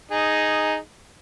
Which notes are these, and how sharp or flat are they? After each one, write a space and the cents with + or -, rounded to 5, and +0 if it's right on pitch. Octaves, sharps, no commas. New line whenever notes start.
D#4 +0 G#4 +0